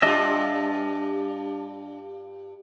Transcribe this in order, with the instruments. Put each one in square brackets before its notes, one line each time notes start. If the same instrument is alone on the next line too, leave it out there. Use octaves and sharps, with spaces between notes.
[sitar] G2 G3 F4 [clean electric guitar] D4 D#5 E5